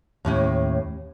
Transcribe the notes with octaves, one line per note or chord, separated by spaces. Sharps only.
D#2 A2 C#4